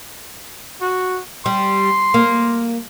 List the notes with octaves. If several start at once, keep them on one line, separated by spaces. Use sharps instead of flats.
F#4
G3 C6
A#3